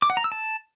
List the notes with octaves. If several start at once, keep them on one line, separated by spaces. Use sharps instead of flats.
D6
F#5
A#5
E6
A5